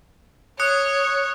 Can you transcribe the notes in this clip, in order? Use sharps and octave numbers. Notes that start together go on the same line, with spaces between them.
C#5 D#6 F#6 C#7